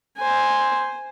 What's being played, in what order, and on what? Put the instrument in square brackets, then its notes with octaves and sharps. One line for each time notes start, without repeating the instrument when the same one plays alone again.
[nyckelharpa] C5 G#5